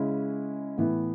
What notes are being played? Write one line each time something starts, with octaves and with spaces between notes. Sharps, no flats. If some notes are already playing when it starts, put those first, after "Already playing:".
Already playing: C#3 G#3 C#4 E4
A2 E3 B3 E4